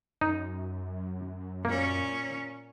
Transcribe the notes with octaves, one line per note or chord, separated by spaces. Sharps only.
F#2 D#4
A#2 A#3 C#4